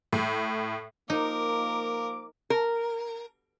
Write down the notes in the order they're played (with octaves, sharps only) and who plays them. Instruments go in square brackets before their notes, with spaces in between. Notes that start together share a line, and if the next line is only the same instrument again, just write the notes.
[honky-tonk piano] A2
[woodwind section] F3 D6 [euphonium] A#3 [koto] D#4 [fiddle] A#4
[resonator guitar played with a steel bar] A#4